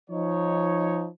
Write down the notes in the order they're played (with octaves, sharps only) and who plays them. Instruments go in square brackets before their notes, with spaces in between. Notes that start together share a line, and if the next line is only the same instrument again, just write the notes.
[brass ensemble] F3 D#4 C#5